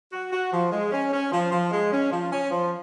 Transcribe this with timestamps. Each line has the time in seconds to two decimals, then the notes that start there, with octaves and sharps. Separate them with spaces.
0.13 F#4
0.32 F#4
0.52 F3
0.71 G#3
0.92 C#4
1.12 C#4
1.32 F3
1.51 F3
1.71 G#3
1.92 C#4
2.11 F3
2.31 C#4
2.50 F3